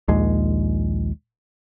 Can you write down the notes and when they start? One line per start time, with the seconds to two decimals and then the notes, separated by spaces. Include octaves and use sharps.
0.08 A#1 D#2 G#3